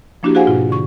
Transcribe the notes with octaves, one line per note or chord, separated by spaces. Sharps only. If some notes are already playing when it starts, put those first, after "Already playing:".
F3 A#3 D4 E4 F#4 G4
F#4 G#4 C5 F5 F#5 G#5
G#2 B2 F4
D3 C#6